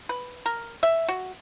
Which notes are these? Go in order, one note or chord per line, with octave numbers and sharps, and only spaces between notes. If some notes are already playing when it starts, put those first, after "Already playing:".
B4
A#4
E5
F#4